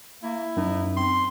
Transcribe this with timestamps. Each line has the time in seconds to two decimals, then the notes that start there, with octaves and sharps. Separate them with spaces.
0.23 A#3 E4
0.57 F#2 D#4
0.97 C4 C6